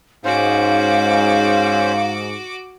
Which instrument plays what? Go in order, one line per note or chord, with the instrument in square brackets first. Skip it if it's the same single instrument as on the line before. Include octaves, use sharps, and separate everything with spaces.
[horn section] G#2 [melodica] C#4 C5 [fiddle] F#4 D6 [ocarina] F5